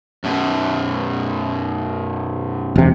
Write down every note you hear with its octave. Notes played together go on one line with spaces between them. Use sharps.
F#2 B2
E1 C3